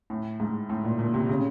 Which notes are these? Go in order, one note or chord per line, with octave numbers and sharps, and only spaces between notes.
A2
G#2
A2
A#2
A#2
C3
C#3